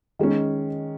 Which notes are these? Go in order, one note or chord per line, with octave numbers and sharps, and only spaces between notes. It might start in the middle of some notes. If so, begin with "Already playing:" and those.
D#3 G#3 C#4